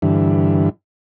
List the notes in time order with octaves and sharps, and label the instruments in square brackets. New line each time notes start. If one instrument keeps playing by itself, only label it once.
[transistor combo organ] G2 D3 E3